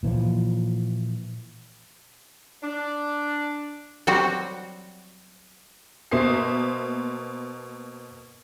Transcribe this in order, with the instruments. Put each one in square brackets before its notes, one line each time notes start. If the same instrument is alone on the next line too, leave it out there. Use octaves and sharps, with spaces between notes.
[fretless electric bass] A#2 E3 F3
[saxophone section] D4
[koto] F#3 G3 C4 F#4
[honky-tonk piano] B2 A#3 C5 E5 D#6 C7